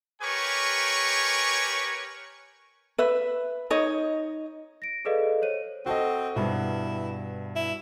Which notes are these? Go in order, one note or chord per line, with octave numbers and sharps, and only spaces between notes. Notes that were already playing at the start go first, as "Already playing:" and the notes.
G4 A#4 B4 C#5 G#5 C#6
B4 E5
D#4 C#5 D#5
A#6 D7
G#4 A4 B4 D5 D#5 F5
C5 C#5 D#7
C4 F#4 A4 D#5
G2 B2 E4
E4